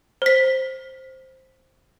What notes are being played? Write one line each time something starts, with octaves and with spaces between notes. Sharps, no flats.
C5 B6